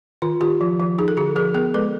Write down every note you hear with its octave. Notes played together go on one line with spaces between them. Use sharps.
D#3 F4
D#3 F4 G4
F3
F3
D#4 G#4
A4
D3 F#4 G#4
F3 G#4 A#4
B3 G#4 A#4
G#3 A4 B4